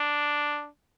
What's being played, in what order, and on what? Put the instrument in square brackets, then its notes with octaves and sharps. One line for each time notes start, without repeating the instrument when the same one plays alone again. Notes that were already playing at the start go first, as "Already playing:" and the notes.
Already playing: [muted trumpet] D4